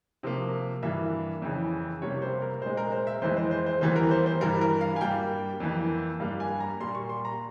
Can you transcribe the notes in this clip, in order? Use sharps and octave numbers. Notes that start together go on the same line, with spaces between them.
C3 F3 A#3
G2 E3 A#3 E5
F2 C#3 E3
C3 G3 A#3 C#5
C5
A#4
A#2 G#3 C5
A#4
C5
E5
F2 E3 G#3 C5
C5
C5
C5
E2 E3 G3 A#3 C5
A#4
C5
C5
G2 E3 G3 A#4
A#4
F5
G#5
G2 G3 A#3 G5
F2 E3 A#3
G2 G3 A#3 F5
G#5
A#5
A#2 G3 A#3 C6
C#6
C6
A#5